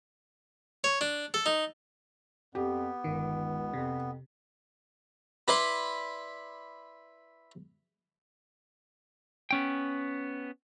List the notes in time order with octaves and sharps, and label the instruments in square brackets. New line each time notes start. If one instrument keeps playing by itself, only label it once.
[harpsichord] C#5
D4
A4
D#4
[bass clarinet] F2 [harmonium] B3 [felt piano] G4
[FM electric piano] G1 D#3 [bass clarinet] C#2
[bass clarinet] F2 [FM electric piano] C3
[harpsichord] E4 B4 D5 B5 C6
[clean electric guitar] B3 C#4 G5